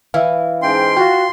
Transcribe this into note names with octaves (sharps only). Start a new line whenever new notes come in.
E3 E4 E5 F5
G#2 C#4 G5 C6
F4 F#4 F5 G5